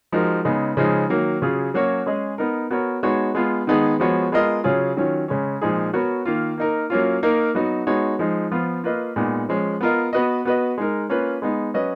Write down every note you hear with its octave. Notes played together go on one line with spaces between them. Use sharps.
F3 G#3 D#4 F#4 A#4
C#3 G#3 B3 D#4
C#3 F3 G#3 D#4
D#3 F#3 A#3
C#3 F#3 C#4 F4 G#4
F#3 A#3 C#4 F#4 C#5
G#3 C#4 G#4 D#5
B3 D#4 A#4
B3 F#4 A#4 C#5
G#3 B3 D#4 F#4 C#5
G#3 B3 F4
D#3 G#3 B3 D#4 G#4
F3 G#3 B3 F#4 C#5
G#3 B3 F4 A#4 D#5
C#3 F#3 C#4 F4 G#4
D#3 F#3 C#4 F4
C#3 G#3 C#4
A#2 F3 G#3 D#4 G#4
B3 F#4 A#4 C#5
D#3 A#3 F4
A#3 D#4 A#4
F#3 A#3 C#4 F4
A#3 D#4 A#4
F#3 B3 D#4 F#4
G#3 B3 D#4 F#4 C#5
F3 G#3 D#4
F3 B3 F4
A#3 F4 B4 D#5
A#2 G#3 B3 D#4
F3 G#3 C#4
B3 F4 A#4 D#5
B3 F#4 B4 D#5
B3 F#4 B4 D#5
G#3 D#4 A#4
A#3 C#4 F4 B4
G#3 B3 D#4
F#3 C#4 F#4 B4 D#5